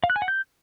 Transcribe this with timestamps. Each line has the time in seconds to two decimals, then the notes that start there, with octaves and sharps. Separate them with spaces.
0.04 F5
0.10 F#6
0.16 G#5
0.22 F#5
0.28 G6